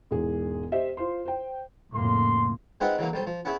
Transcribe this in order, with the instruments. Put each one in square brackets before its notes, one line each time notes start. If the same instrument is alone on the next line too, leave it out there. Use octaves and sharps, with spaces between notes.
[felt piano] E1 G#2 E3 G#4
G4 C5 D#5 E5
F4 C5 C6
C5 G5
[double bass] F2 A#3 [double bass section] A2 C#3 [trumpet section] C6
[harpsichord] G#3 C4 D#4 F4 B4 F#5
C#3 E3 F#3 A#3
B1 G3 C5
F3
B3 C#4 E4 G#4 E5